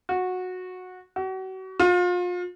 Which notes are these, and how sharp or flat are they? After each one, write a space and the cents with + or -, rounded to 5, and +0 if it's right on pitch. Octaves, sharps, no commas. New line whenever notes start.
F#4 -15
F#4 +35
F4 +35